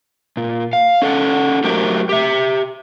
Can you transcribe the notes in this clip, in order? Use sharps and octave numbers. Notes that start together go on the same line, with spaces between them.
A#2
F5
C#4 A4 F#5
F#3 A3 G4 A#4 C5 G5
G4 E5